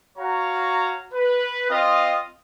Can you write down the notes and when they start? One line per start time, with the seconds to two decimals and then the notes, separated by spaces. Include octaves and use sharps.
0.17 F#4 C#5 F5 A#5
1.13 B4
1.70 C4 F4 D#5 F5 D#6